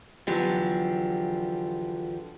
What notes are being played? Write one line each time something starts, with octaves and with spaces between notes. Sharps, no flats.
E2 D3 F3 F#3 G4